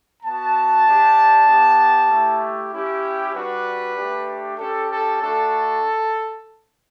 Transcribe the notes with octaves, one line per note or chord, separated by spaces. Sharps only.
B3 F#4 A5
G3 D4 G4
B3 D4 G4
A3 E4 G4
C#4 E4 G4
G3 D4 F#4 B4
A3 D4 G4
C#4 G4 A4
A4
A3 D4 F#4 A4